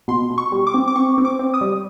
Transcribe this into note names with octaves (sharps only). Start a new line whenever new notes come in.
B2 C6
B2
C#6
G3
D6
C4
D6
C4 C#6
C4
D6
C4
D#6
G3